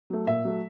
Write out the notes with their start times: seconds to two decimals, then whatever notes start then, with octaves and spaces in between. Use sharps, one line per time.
0.10 F#3 A3
0.26 A#2 E5
0.45 F#3 A3